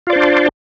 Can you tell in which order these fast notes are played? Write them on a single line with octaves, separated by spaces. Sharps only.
F4 D5 C5 D4